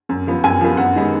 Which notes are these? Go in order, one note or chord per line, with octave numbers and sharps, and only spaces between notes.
F#2
F3 B3
F#2 G#5
F3 B3
F#2 F#5
D#3 G#3 B3